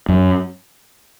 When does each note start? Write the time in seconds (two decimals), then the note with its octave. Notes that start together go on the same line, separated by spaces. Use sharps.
0.09 F#2